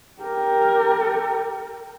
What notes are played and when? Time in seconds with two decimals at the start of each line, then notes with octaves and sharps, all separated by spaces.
0.22 G4 A#4